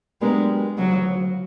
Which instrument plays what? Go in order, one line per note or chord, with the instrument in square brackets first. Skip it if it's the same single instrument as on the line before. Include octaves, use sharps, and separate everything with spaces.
[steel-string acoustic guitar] F#3 B3 D4 G4 A#4 [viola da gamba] G#3
[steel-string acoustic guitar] D2 C#3 F3 [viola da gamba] F#3